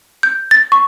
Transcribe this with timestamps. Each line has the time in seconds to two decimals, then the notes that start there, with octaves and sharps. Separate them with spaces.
0.23 G6
0.51 A6
0.72 C#6